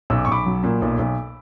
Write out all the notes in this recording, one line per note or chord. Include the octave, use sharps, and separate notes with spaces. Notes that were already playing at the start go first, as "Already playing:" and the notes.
B1 E6
D6
C#6
B1 B5 D6
F#3
A#2
B1
B1